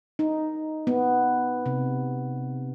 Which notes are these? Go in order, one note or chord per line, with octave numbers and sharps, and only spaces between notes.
D#4
B3
C3